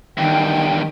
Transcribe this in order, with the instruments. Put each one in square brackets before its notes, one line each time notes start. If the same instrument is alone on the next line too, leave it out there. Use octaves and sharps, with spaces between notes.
[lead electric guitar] E2 G2 [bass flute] D#3 [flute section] G5